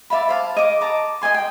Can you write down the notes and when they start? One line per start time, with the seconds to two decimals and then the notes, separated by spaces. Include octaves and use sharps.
0.10 D5 E5 F5 B5
0.29 C5 F5 A5
0.57 D#5 D6
0.81 A5 A#5 D6
1.21 D#5 F5 G#5 C6
1.34 G5